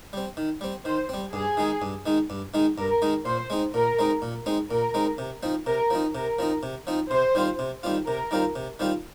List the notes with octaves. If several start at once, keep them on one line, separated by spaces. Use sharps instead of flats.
G3 C4
D#3
G3 C4
D#3 C5
G3 C4
G2 G#4
D#3 G#3 D#4
G2
D#3 G#3 D#4
G2
D#3 G#3 D#4
G2 A#4
D#3 G#3 D#4
A#2 C5
G#3 C4 D#4
A#2 A#4
G#3 C4 D#4
A#2
G#3 C4 D#4
A#2 A#4
G#3 C4 D#4
C3
F3 C4 D#4
C3 A#4
F3 C4 D#4
C3 A#4
F3 C4 D#4
C3
F3 C4 D#4
C3 C5
D#3 G3 C4 F4
C3
D#3 G3 C4 F4
C3 A#4
D#3 G3 C4 F4
C3
D#3 G3 C4 F4